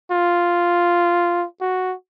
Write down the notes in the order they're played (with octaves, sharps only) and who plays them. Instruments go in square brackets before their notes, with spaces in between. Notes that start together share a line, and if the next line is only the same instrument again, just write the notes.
[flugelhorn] F4
F#4